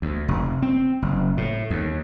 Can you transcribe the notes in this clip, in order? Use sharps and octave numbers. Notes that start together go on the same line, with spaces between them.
D2
F1
C4
F#1
A2
D#2